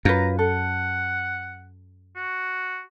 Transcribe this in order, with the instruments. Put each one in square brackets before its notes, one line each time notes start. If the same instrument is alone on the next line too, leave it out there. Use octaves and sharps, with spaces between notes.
[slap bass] F#2 [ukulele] F4 B4 [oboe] A#5
[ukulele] A4 [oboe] F#5
[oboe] F#4